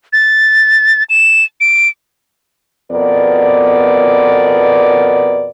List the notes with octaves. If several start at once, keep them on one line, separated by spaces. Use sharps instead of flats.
A6
E7
D7
F2 B2 B3 A#4 D5